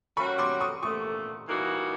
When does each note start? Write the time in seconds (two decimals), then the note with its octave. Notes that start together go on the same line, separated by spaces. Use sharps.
0.17 G3 A#3 C#4 F#4 B5 C#6
0.38 C6 D6
0.61 C#6 D#6
0.82 A#2 F3 A3 C#6 D#6
1.48 E3 G3 A#3 D#4 F#4